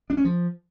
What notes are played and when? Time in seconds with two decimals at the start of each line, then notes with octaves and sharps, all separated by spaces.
0.10 D4
0.17 C#4
0.25 F3